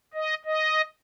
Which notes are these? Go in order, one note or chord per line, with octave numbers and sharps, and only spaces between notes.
D#5
D#5